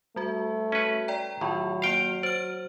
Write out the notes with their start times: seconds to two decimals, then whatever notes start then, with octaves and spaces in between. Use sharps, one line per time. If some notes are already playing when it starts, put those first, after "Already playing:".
0.16 G3 A3 F#4
0.72 C#4 B4
1.08 D5 G5 A#5
1.41 A2 D#3 F#3 F4
1.82 A#3 F5 G5 F6 F7
2.23 C5 D5 F6